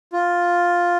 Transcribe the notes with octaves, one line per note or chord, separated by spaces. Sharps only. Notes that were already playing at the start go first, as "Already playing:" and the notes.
F4